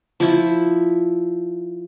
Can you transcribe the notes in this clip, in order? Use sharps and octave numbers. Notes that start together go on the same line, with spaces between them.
F3 E4